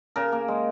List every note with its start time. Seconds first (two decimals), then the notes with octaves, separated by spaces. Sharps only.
0.16 C#3 A#4
0.32 A#3
0.48 G#3